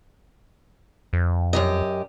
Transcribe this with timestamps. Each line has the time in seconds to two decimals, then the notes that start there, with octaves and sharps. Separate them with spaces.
1.13 F2
1.53 F#2 G4 D#5